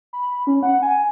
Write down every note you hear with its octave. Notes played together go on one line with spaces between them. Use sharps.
B5
C#4
F#5
G#5